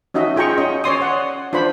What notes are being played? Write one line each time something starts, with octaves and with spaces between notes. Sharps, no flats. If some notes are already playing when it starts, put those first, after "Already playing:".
C#4 D#4 F#4 D#5 E5
F4 G#4 G5 A#5 C#6
C#4 D#5
C#5 D5 C6 D#6
F#5
D4 F4 C5 B5